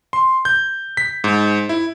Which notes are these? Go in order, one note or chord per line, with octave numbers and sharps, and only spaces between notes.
C6
G6
B6
G#2
E4